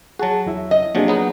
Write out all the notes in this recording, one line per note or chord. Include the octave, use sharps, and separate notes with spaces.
F#3 F#4 G#4 A5
E2 E4 E5
D#5
C3 F3 F#3 A#3 D4 G#4
F#3 B3 D#4